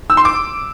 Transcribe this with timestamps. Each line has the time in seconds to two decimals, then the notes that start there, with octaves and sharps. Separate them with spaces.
0.10 E6
0.17 C6
0.25 D6